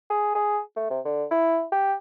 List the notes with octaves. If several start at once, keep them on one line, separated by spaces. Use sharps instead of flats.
G#4
G#4
A3
C3
D3
E4
G4